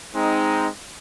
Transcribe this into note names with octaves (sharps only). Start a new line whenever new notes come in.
G#3 C4 D#4